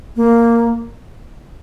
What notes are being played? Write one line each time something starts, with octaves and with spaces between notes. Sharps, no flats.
A#3